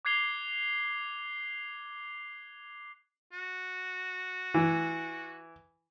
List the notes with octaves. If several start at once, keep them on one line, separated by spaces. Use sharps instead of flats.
D6 F#6 G#6 C7 F7 G7
F#4
E3